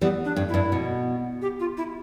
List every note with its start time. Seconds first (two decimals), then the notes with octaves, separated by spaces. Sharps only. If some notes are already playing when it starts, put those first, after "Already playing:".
0.01 E3 G3 B3
0.25 D4
0.36 G2
0.49 G2 E4
0.72 B2
1.42 G4
1.60 F4
1.77 E4